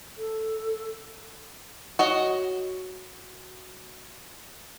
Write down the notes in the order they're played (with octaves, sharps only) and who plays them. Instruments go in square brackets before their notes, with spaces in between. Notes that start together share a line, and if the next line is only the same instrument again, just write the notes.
[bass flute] A4
[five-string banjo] F#4 C#5 D#5